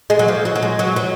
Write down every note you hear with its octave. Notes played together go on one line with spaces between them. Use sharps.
G#3
F#3
F3
F#3
F#3
G#3
F#3
F#3